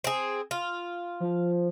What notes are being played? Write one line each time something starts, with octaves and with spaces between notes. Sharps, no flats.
C4 G#4
F4
F3